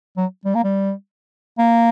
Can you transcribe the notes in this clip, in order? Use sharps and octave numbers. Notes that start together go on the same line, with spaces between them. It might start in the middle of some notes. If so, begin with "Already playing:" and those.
F#3
G3
A#3
G3
A#3